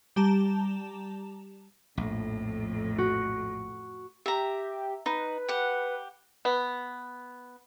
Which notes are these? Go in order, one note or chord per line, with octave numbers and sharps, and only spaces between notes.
G3 G4 A5 A#5 E7
A#1 F2 A2
F#4
G4 E5 A#5
D#4 B4
G4 F#5
B3